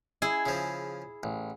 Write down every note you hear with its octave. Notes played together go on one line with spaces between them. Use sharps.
E4 G#4
C#3 F3
A1